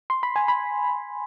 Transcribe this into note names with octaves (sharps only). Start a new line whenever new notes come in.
C6
B5
G#5
B5